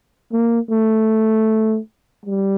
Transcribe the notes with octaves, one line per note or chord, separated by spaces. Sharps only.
A#3
A3
G3